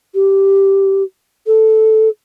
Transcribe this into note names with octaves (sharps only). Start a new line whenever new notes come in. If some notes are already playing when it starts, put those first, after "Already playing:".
G4
A4